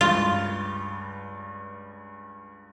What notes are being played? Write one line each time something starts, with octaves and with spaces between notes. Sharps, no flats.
C#2 G2 F4 A6